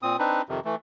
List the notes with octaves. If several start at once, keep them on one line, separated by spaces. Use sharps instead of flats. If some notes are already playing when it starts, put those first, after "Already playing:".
A#2 C4 D#6
C4 D4 D#4 B4
F2 C3 D#3
E3 A3